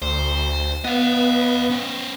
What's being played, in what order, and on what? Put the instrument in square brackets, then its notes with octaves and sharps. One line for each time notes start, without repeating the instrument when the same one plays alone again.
[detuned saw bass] D2 [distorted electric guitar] C5
[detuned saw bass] B3 [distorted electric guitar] D#5 F5
[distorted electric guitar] C#4 C5